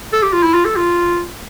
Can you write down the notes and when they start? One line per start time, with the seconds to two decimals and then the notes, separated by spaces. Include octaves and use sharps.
0.13 A4
0.23 G4
0.33 F4
0.43 E4
0.54 F4
0.65 A4
0.76 F4